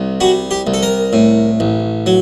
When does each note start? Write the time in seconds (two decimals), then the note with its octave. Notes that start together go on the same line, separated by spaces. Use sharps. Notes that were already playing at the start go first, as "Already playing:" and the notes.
Already playing: C2 C3
0.20 G3 F#4
0.51 G4
0.67 C2
0.74 A4
0.83 A#4
1.13 A2
1.60 A1
2.06 F#3